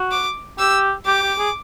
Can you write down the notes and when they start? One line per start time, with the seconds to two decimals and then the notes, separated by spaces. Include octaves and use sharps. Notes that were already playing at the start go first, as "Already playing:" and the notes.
Already playing: F#4
0.12 D6
0.59 G4 E6
1.06 G4 D6
1.22 G4
1.39 G#4